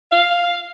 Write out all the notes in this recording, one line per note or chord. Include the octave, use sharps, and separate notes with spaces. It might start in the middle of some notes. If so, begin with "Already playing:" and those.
F5